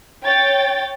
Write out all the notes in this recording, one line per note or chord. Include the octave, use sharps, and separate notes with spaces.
C#5 G5 A6